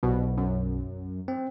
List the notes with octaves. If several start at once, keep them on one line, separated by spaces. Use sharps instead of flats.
B1 B2
F#2
C4